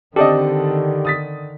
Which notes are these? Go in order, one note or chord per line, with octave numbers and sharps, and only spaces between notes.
D3 D#3 C4 D4 G4 A4 D5 D#5
D#6 A6 B6